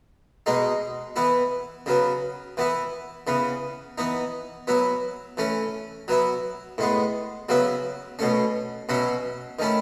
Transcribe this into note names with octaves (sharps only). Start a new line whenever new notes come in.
B2 G#3 D#4
E3 B3 E4
C#3 F#3 B3
E3 B3 E4
C#3 E3 B3
E3 B3 D#4
F#3 B3 E4
E3 A3 C#4
F#3 B3 E4
A2 G#3 B3
C#3 F#3 B3 E4
B2 A3 C#4
B2 F#3 C#4 E4
D#3 A3 C#4 E4